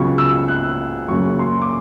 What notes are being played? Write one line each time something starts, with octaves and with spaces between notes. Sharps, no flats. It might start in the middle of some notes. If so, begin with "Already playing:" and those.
Already playing: C#2 C#3 F#3 B3 C#6
E6
F#6
F#2 C#3 F#3 A#3 C#6
C6
D6